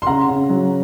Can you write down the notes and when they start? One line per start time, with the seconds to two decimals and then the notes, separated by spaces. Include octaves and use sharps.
0.02 C6
0.07 C#3 F#5 A#5
0.28 C#3
0.49 F#3